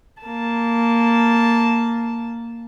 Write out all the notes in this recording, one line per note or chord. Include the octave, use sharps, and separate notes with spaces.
A#3 A5